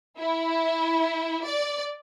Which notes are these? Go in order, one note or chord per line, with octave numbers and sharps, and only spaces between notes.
E4
D5